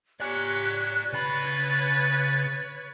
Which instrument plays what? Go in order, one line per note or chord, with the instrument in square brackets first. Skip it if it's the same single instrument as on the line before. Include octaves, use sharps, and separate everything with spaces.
[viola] G4 C#5 [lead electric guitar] D5 G#5 [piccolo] F#6
[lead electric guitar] C#3 B5 [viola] B4 C#5 [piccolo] A6